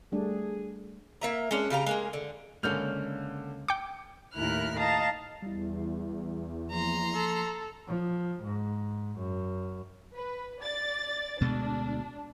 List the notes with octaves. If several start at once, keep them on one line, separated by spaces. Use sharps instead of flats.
G3 A3 D4 G#4
A#3 E5 A#5
G#3 C#4 D4
C#3 G4 F5 A#5
G#3 A#3 G#4
D3
C#2 D3 G#3 A#3 C#4 F6 G6 F7
G5 D6 C#7
D#2 A2 E4 A#4 F6 F#6
D#5 F5 A5 A#5
E2 G3 E4
F3 A#3 A#5 C6
A4
F3
G#2
F#2
B4
D5 A6
D2 B2 G#3 D4